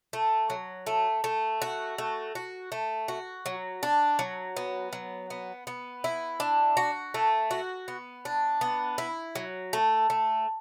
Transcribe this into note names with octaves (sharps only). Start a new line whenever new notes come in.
A3
F#3
A3
A3
F#4
A3
F#4
A3
F#4
F#3
D4
F#3
B3
F#3
B3
B3
E4
D4
F#4
A3
F#4
B3
D4
B3
E4
F#3
A3
A3